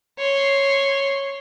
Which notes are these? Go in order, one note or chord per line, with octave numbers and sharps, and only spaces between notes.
C#5 C6